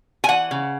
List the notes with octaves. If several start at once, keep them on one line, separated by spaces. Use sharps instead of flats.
G#5
E3 F#5
C#3